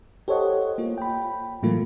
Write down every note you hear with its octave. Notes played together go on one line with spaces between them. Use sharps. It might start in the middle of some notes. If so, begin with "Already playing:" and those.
G4 A4 C5 C#5 D#5 F#5
A#3 F4
G5 B5
A2 E3 F#3 A3 A#3 F4